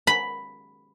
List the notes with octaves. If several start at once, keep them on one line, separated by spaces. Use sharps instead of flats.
B5